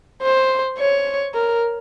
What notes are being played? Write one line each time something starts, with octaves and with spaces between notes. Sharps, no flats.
C5
C#5
A#4